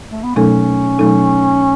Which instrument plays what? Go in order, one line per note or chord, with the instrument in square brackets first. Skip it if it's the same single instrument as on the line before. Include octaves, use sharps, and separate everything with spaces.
[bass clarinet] A3
B3
[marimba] B2 F#3 A3 D#4 A4 [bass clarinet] C#4
[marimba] B2 F#3 A3 D#4 A4